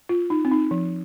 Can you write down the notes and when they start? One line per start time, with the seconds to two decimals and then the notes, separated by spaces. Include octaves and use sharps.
0.09 F4
0.30 D#4
0.45 C4
0.52 D#4
0.71 F3